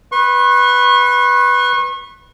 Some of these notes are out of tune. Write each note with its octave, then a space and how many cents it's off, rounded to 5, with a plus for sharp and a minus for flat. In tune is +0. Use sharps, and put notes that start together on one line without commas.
B4 +0 C#6 -40